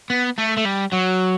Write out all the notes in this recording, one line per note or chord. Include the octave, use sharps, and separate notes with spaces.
B3
A3
A3
G3
F#3